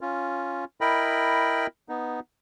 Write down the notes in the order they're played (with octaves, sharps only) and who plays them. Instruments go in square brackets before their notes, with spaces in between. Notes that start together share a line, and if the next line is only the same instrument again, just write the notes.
[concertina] C#4 F4
E4 A#4 D#5 G5 B5
B3 D#4